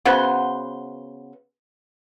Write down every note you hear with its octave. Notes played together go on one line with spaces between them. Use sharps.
C#3 B3 F#4 C5